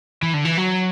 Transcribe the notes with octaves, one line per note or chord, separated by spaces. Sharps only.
E3
D3
E3
F#3